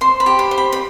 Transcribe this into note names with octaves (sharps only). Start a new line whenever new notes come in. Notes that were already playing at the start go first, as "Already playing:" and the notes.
C5 C6
B5
G4
B5
C5
B5
B5